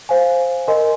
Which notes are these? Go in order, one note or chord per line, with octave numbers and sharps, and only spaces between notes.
C5 F5 G#5
A#4 D#5 G#5 C6